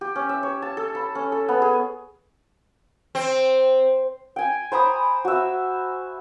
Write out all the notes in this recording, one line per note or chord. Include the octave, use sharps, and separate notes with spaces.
G4
C#4
E5
C#5
A5
A4
B5
C#4
A4
B3
G#4
C4
G5 G#5
C5 A#5 B5 D#6
F#4 E5